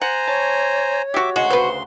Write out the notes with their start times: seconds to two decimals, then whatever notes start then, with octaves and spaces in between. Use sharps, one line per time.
0.02 C5 F#5 G#5 A#5
0.27 C#5 A5
1.14 F#4 G4 E5 D6
1.36 D2 C#3 G#3 F#4 C6
1.50 B4 C5